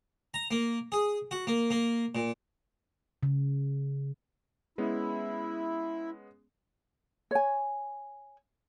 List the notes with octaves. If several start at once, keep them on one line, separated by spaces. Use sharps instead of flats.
A#5
A#3
G#4
F#4
A#3
A#3
A#2
C#3
G#3 B3 C#4 E4
C#5 G#5